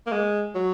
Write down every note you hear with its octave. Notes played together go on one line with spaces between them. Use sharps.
A#3
G#3
F#3